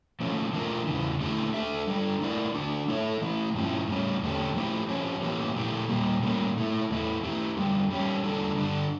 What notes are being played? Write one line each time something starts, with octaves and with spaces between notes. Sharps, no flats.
F3 A3 C#4
E3 A3 D4 F4 A#4
E2 C#3 E3
D3 A3 E4 G4
A3 D4 A4 E5
G3 D4 A4
A3 E4 A#4 D5
D3 A3 D4
A3 E4 A4 C#5 E5
E3 A3 E4
G2 F3 C#4 E4
A2 G3 C#4
E2 D3 A3 C#4 G4
F3 A3 E4 G4
F3 C#4 G4 C#5
A2 E3 A#3 C#4 G4
A#2 F3 A3 E4 G4
A#2 G3 A#3
A2 G3 A#3 C#4
A#2 A3 E4
E2 E3 A3 E4
A3 E4 G4
F2 D3 G3
G3 C#4 G4
E2 D3 G3 D4 A4
G2 D3 G3 D4